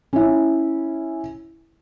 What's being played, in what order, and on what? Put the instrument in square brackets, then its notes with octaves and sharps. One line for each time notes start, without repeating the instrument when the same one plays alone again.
[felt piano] C#4 E4